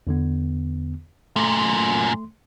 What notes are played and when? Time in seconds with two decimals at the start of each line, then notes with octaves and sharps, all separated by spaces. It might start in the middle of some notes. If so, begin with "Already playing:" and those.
0.07 E2 D3 B3
1.36 F#2 A#2 A3 C6